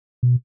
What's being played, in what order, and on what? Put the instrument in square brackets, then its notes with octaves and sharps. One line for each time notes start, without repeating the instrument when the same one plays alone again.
[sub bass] B2